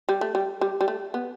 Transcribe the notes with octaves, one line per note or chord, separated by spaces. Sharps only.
G3
A3
G3
G3
G3
A3
B3